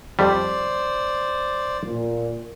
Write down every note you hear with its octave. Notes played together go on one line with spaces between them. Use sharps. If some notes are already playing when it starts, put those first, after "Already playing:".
F2 G3 C5 D5
A#2